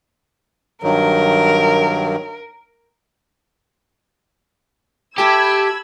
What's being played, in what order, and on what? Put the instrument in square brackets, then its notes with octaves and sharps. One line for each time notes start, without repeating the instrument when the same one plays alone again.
[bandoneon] G2 D#3 F#3 [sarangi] A#4
[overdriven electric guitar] G4 [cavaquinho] A4 E5 A5 [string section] B5 E6 G#6